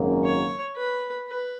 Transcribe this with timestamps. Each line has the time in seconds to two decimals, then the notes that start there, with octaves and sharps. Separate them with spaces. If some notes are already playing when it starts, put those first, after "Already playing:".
Already playing: G#1 F#2 C#3 F#3 A#3
0.25 C#5
0.77 B4
1.28 B4